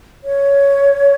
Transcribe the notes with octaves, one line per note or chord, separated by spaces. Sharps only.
C#5